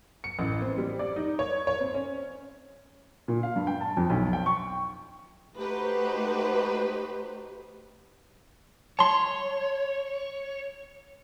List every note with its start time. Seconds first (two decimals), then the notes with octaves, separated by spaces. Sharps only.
0.24 C#7
0.39 A1
0.62 C4
0.78 G3
0.99 D5
1.16 D#4
1.39 C#5
1.67 C#5
1.80 C4
1.94 C#4
3.28 A#2
3.43 F5
3.56 G2
3.67 G5
3.81 A5
3.97 F2
4.10 B1
4.33 G5
4.46 C#6
5.55 A3 D#4 F#4 G4 B4 C5
8.99 C#5 A5 C6